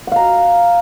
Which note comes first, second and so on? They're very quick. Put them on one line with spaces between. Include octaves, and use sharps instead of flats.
F#5 F5 A#5